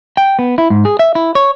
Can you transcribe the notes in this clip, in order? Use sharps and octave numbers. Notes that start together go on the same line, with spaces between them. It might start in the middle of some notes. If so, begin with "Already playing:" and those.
G5
B3
E4
G#2
G#4
E5
E4
C#5